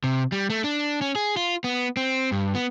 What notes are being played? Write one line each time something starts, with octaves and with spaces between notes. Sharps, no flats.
C3
G3
A3
D4
C#4
G#4
F4
B3
C4
G2
B3